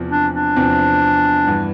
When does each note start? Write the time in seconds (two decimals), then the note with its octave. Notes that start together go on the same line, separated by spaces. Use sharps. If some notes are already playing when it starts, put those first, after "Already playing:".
Already playing: E2 C3 F3 C4
0.11 D4
0.34 D4
0.56 E2 C3 F3 C4
1.47 G2 E3 B3